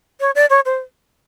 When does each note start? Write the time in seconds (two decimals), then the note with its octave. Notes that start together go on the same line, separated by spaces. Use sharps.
0.20 C#5
0.35 D5
0.50 C#5
0.65 C5